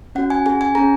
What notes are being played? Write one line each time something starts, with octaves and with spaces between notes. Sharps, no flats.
C#4 F#4 F#5
G#5
C#4 G#4 G#5
G#5
C#4 G#4 A#5